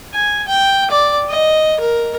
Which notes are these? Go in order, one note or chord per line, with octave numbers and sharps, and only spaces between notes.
G#5
G5
D5
D#5
A#4